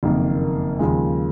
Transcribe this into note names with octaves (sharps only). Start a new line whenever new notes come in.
F#1 F2 D#3 A#3
D#2 C#3 F3 G#3